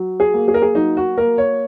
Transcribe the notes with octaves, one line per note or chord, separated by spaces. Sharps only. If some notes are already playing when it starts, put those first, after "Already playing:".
Already playing: F#3
G#4
A#3
G#4
A#4
G#4
F#3 D#4
F#4
A#3 A#4
C#5